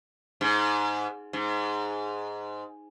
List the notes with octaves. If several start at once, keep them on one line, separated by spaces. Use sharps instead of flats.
G#2
G#2